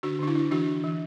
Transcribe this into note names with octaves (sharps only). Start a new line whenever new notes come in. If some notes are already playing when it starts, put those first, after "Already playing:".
D3 D4 F#4
D3 D4
E4
D4
E3 D4 F#4
D4
E3